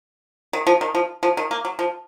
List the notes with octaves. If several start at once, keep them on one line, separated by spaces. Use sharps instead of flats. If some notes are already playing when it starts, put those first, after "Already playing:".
D#3
F3
D#3
F3
F3
D#3
A#3
F#3
F3